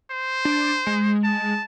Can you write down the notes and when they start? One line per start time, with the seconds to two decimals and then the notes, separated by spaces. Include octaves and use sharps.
0.11 C5
0.45 D4
0.87 G#3
1.24 A5